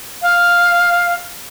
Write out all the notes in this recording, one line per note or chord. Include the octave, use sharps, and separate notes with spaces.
F5